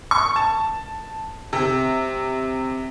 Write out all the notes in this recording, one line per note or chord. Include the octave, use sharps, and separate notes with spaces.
C#6
A5
C3